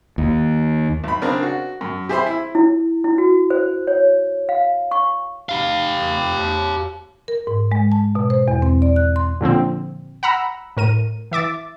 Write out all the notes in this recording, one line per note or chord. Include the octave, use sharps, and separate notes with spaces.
D#2
B1 B5
C#3 C4 D4 A#4
F#4
F#2
G4 G#4 C5 E5 B5 C6
E4
E4
E4
F#4
C5
C#5
F5
C#6
G4 F5
A#4
G#2
G#3
A5
B2
C5
E2
C4
D5
F#6
C6
A#2 D3 F3 C4
F#5 A#5 B5 E6
A2 A#4 D#7
E3 E5 D6 A6